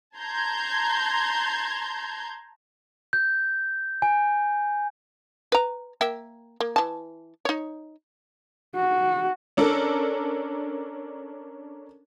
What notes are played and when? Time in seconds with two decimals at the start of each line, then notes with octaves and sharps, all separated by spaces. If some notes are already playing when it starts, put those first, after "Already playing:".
0.18 A5 A#5 C6 G6 G#6
3.13 G6
4.02 G#5
5.52 B4 A#5
6.01 A#3 E5 G5
6.60 A#3
6.76 E3 A5
7.45 D#4 C#5
8.75 F#4
9.57 C#4 D4 A4 A#4